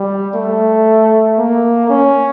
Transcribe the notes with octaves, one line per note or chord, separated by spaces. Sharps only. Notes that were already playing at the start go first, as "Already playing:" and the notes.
Already playing: G3
A3
A#3
C#4